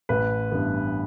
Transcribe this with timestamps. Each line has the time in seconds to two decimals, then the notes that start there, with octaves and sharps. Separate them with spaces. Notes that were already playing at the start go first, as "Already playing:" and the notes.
0.09 A1 B4
0.51 G2 E3 B3